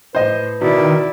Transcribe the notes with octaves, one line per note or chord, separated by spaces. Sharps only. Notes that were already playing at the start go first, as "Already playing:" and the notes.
A2 B4 C5 D#5
B2 D#3 E4 D5